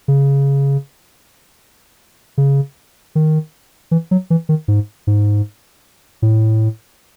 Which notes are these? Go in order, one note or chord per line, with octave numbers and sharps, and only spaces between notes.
C#3
C#3
D#3
E3
F#3
E3
D#3
G#2
G#2
A2